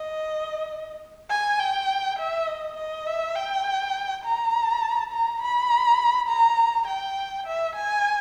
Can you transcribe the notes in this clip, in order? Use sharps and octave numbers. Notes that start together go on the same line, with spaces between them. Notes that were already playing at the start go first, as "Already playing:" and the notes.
Already playing: D#5
G#5
G5
E5
D#5
D#5
E5
G5
A#5
A#5
B5
A#5
G5
E5
G#5